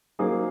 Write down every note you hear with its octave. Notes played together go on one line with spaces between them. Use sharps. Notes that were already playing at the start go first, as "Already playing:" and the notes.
F#3 A#3 D#4 G#4 C5